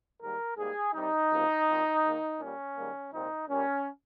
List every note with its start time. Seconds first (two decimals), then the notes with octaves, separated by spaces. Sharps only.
0.22 G#2 D#3 G3 A#3 A#4
0.58 G#2 G3 A#3 G#4
0.94 C2 C3 G3 D#4
1.32 C#2 C3 F3 A#3
1.68 A#2 F3 C4
2.03 G#2 D#3 A#3
2.40 A#2 G3 A#3 C#4
2.77 G#2 D#3 G3 A#3
3.13 C2 A#2 F3 C4 D#4
3.49 A#2 G3 A#3 C#4